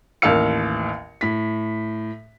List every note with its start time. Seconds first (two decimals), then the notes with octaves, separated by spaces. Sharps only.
0.22 A1 D#2 A#4 F5 E6 C#7
1.21 A2 B6